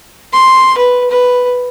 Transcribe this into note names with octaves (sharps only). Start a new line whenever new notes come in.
C6
B4
B4